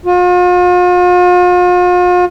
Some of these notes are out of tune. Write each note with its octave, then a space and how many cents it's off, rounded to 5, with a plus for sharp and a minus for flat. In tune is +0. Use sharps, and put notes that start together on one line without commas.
F4 +40